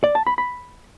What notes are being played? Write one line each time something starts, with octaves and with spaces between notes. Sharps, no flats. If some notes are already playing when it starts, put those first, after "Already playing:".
D5
A5
B5
B5